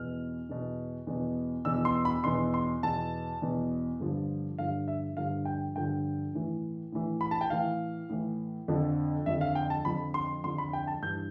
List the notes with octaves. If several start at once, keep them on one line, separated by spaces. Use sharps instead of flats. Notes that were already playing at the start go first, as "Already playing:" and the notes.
Already playing: E2 B2 F6
E2 B2
E2 B2
E2 B2 E6
C6
B5
E2 B2 C6
C6
E2 B2 A5
E2 B2
G2 D3 F3
G2 D3 F3 F5
E5
G2 D3 F3 F5
G5
G2 D3 F3 G5
A2 E3
A2 E3
B5
A5
G5
A2 E3 F5
A2 E3
F2 D3 F3
F2 D3 F3 E5
F5
G5
A5
F2 D3 F3 B5
C6
F2 D3 F3 C6
B5
G5
A5
G2 E3 G6